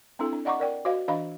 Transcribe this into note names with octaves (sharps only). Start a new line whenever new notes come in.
C4 D4 E4 A4
D4
D5 D#5 F#5 A#5 C#6 D6
A#4 D5 G5
F#4 C5 D#5 F5
E3 D4 D#5 F5 B5